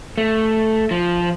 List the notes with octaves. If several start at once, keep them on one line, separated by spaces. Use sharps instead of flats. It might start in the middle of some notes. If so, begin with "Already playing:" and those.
A3
F3